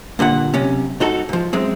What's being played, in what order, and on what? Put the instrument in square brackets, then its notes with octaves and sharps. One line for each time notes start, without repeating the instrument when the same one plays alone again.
[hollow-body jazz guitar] G2 A#2 D3 F#5
B1 C3 C#4
G#2 D#4 F#4 A4
G#2 F3
F#2 G#3 C4